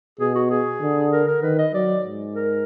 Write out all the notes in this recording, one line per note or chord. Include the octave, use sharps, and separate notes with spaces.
B2 G#4
F#4
G#4
D3
A#4
A#4
D#3 B4
D#5
F#3 D5
G#2
A#4